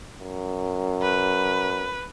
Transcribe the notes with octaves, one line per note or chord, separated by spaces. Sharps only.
F#2
B4